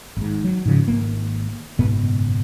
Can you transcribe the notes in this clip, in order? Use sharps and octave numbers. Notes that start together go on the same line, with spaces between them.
G#1 G#2
F#3
G#2 C#3 F3
G#1 A#3
F#1 G#2 B2 B3